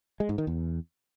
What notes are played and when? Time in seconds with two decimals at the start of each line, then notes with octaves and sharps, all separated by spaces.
0.20 G#3
0.29 G#2
0.38 D#3
0.47 E2